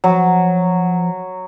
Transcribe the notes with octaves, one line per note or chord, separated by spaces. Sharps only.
F3 F#3